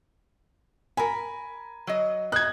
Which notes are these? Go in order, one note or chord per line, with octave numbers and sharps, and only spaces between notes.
A#4 G#5 B5
F#3 D#5
D#5 F#6 G#6